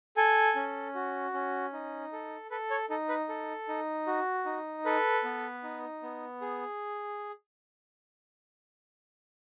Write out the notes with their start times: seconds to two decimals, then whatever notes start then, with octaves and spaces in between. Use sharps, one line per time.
0.17 A4 G#5
0.56 C#4
0.95 F#4
1.34 C#4
1.73 D#4
2.12 A4
2.51 A4 B4
2.70 C#5
2.90 D#4 A4
3.09 B4
3.29 A4
3.68 D#4
4.07 F#4
4.45 D#4
4.85 A4 B4
5.24 B3
5.63 D#4
6.02 B3
6.41 G#4